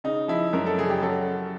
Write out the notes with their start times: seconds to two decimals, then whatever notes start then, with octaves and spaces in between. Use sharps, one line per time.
0.04 C#3 D#4
0.28 F3 E4
0.53 F#2 A#4
0.66 A4
0.78 C#3 G#4
0.90 G4
1.02 F#3 A4